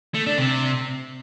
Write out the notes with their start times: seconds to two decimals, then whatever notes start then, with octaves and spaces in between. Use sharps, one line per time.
0.14 A3
0.26 D4
0.38 C3